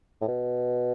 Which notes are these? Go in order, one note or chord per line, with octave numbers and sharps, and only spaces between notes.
A2
B2